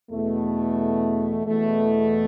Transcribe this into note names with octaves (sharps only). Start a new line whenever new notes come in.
E2 B2 A3
E2 B2 A3